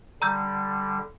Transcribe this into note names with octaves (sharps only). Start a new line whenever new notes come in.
D3 G3 A#5 E6 G6